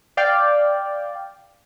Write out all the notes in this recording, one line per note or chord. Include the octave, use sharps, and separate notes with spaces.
D5 F5 G5